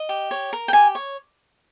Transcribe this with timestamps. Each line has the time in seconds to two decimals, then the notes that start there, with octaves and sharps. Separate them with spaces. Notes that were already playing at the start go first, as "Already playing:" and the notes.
Already playing: D#5
0.09 G4
0.31 C#5
0.53 A#4
0.68 G5
0.73 G4 G#5
0.95 C#5